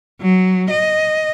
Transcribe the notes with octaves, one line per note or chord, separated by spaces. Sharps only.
F#3
D#5